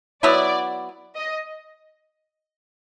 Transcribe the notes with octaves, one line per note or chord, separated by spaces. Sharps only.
F#3 B3 E4 D5
D#5